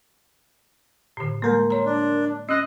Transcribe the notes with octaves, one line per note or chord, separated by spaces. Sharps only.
A2 D3
G3 G#3 A#3 A#4 C6
C#5 A#5
D4
C#4 D#5 E6 F#6 A#6